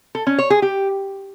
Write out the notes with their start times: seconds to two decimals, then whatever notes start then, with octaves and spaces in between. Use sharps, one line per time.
0.15 A4
0.27 C#4
0.39 C#5
0.50 G#4
0.62 G4